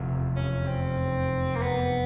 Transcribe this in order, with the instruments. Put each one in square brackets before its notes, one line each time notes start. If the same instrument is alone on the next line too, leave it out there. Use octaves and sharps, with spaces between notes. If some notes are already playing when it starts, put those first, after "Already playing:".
Already playing: [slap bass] F1 E2 C3
[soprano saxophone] C#4
C4
A#3
B3